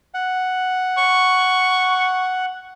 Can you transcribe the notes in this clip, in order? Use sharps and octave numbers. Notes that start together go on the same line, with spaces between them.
F#5
C#6